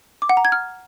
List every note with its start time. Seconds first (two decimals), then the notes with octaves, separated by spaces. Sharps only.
0.22 D6
0.29 F#5
0.37 A#5
0.45 G#6
0.52 F6